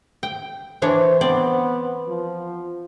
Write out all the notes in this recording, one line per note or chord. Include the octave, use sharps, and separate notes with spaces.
G5
E3 D4 C5 C#5
B3 C4 D5
F3